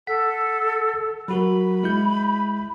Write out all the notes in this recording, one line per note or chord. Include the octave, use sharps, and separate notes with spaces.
A4 F#5 B6
F#3 F#4 A#4 B5
G#3 E4 G6